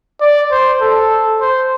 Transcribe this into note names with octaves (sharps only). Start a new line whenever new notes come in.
D5
C5
A4
C5